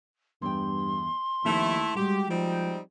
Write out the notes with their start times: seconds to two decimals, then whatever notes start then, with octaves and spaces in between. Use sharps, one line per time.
0.42 E2 G2 G5 C6
1.45 D#2 F3 A3 C4 D#4 E4
1.95 G3 G#3 F#4 G4
2.29 F3 G3 C4 D#4